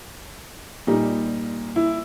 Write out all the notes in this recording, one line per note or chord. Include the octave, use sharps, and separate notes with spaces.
A#2 G3 D#4
E4